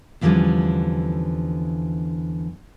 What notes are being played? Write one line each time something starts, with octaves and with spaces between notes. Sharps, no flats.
E2 D3 E3 F3 G3 C#4